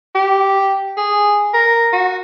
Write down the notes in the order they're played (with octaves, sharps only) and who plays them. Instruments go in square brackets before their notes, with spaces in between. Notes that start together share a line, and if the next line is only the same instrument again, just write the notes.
[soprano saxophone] G4
G#4
A#4
F#4